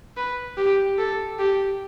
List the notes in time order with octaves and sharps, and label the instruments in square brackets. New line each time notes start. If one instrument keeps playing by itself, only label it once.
[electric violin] B4
G4
A4
G4